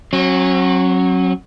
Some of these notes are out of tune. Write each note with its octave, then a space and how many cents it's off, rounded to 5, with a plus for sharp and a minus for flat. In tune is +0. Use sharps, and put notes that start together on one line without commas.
F#3 +0 C#4 -40